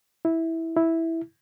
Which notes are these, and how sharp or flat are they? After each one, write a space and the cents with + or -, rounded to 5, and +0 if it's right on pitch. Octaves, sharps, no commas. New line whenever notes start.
E4 -10
E4 -5